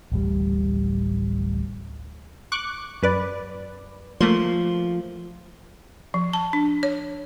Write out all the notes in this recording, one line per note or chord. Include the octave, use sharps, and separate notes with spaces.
D1 A1 G3
C#6 D6 F#6
F#2 B4 D5
F3 A3 A#3 C6
F3
A5
D4
C#5